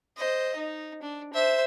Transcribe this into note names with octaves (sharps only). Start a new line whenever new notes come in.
C5 D#5
D#4
D4
C5 E5